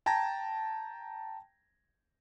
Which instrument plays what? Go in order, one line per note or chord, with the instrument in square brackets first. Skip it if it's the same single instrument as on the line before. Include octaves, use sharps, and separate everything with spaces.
[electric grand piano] G5 A5 A#5 G#6 A#6